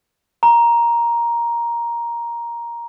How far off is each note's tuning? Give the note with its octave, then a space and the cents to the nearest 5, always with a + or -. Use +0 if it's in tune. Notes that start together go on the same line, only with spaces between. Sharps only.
A#5 +10